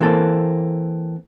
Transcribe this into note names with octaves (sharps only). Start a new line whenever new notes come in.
E3 A#3 C4 A4